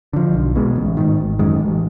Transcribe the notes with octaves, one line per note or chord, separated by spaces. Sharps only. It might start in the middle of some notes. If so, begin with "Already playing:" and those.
D3 F3
B1
B2 G#3
A1
G#2 D#3
G#1
F#2 D#3 G#3
A1